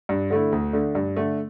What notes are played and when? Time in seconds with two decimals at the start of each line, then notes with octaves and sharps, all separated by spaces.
0.09 G2
0.30 D3 A3 E4
0.52 D2
0.73 D3 A3
0.95 G2
1.16 D3 A3